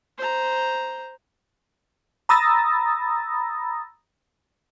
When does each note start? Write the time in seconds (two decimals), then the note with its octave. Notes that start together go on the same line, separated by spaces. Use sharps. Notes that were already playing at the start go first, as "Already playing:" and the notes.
0.18 C5 A#5
2.29 A#5 B5 D#6 E6 A6 A#6